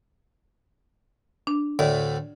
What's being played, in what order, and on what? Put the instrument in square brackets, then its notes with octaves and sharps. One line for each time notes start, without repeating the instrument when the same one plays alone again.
[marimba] D4
[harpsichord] D2 A2 [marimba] D5